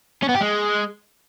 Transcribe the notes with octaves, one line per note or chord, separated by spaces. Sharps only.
C#4
B3
G4
G#3